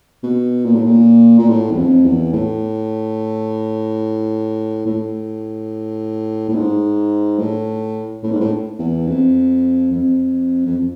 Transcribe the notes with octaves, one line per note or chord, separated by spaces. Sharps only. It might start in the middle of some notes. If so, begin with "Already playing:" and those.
B2
A#2
A2
A#2
A#2
A2
E2
F2
E2
A2
A2
A2
G#2
A2
A2
G#2
A2
E2
F2
F2
F2